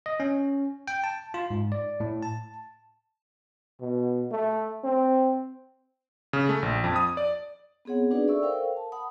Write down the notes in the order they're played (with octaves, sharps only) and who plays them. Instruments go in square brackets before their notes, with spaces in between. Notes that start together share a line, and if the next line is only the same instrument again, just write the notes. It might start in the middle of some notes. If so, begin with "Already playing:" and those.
[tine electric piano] D#5
C#4
G5
A5
F4
G#2
D5
A2
A5
[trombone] B2
A3
C4
[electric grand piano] C#3
A3
A#1
F2
D#6
D5
[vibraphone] B3 C4 G#4 C#5 F#5
D4 D#4 F#4 G#4 B4 D5
A4 D5 E5 C#6 E6
A4 A#4 C5 F5 G5
A5
F#5 A5 B5 D#6